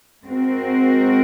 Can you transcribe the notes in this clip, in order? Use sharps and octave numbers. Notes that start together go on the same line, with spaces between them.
G#3 C4 F#4 A#4